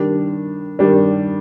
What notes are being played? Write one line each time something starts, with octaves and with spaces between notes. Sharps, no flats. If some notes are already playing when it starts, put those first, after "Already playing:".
Already playing: D#3 G3 D4
D#3 G3 D4